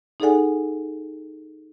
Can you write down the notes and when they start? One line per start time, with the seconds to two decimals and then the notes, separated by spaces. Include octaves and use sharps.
0.20 D#4 G#4 A4 D5 F#5 G#5